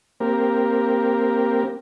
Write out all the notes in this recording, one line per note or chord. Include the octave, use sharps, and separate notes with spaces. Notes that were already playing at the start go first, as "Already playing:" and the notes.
A#3 C4 G4 A#4